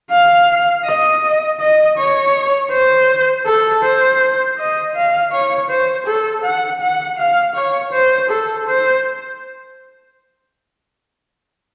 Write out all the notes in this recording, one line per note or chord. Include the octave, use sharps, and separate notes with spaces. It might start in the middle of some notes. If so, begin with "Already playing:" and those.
F5
D#5
D#5
C#5
C5
A4
C5
D#5
F5
C#5
C5
A4
F#5
F#5
F5
C#5
C5
A4
C5